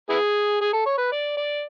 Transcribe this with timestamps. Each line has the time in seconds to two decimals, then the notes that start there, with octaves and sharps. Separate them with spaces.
0.10 B3 E4 G#4
0.61 G#4
0.73 A4
0.86 C#5
0.98 B4
1.12 D5
1.37 D5